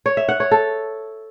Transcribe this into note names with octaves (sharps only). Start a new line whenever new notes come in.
C#5
E5
F#5
C#5
A4